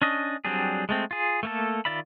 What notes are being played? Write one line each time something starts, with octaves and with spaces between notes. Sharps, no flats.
C#4 D4 D#5
F#3 G3 C4 D4 G#4
G#3 A3 C4
F4 G#4
A3 A#3 A4
D#3 F4 D5 E5 B5